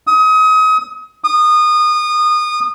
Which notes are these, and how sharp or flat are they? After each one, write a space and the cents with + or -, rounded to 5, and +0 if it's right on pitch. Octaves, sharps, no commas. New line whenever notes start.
D#6 +30
D#6 -25